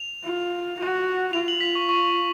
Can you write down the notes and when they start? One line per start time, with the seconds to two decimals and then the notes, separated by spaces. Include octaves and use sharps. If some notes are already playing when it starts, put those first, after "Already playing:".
Already playing: F7
0.24 F4
0.79 F#4
1.33 F4 F7
1.48 F#7
1.61 B6
1.75 C#6
1.89 C#6